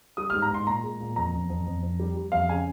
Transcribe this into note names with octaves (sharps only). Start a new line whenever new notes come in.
G3 D#6
G#2 F6
A#5
G#2 C6
A#2 A#5
G#3
A#2
F2 A#5
F2
F2
F2
F2
G3
G3
F2 F5
C#3 G#5